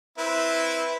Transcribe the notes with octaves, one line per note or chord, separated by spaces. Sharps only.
C4 E4 B4